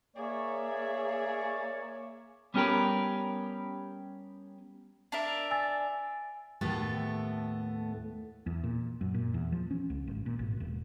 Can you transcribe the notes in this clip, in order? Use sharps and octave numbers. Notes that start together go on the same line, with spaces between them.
A#3 G#4 C#5 D5 E5
G3 B3 C#4 G4 A#4 B4
D4 A#4 E5
G#5 E6 A6
D#2 A2 A3 B3 A4
E2
A#2
F#2
A#2
E2
F3
C#4
C#2
G#1
A#2
G#1
E1